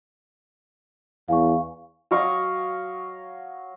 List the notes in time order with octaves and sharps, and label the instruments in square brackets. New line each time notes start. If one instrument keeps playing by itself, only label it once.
[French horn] E2 [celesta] F5 G#5 C#6
[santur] F#3 D#5 F5 C#6